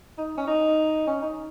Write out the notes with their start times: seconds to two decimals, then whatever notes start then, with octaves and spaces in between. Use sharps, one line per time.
0.18 D#4
0.37 C#4
0.47 D#4
1.07 C#4
1.22 D#4